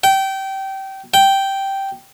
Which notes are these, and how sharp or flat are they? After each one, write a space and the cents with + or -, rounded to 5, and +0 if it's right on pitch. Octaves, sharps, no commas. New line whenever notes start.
G5 -20
G5 -5